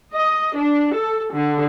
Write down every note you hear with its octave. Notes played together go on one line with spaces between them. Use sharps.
D#5
D4
A4
D3